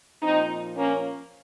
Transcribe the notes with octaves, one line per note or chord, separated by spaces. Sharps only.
A#2 F3 C4 D#4
A#3 C#4